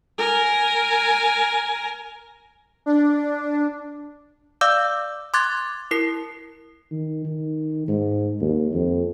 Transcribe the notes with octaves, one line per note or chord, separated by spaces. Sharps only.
A#4 G#5
D4
D5 F5 D6 E6 G6
C6 D6 F#6 G#6 A6
E4 A#4 C7
D#3
D#3
G#2
D#2
F2